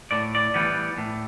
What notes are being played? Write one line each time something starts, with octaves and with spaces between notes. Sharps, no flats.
A2 D5
D5
E3 G3 B3
A2